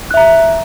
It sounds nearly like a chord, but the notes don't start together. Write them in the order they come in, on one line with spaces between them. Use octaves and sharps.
F#6 E5 A#5